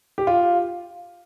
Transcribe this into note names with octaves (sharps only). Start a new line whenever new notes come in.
G4
F4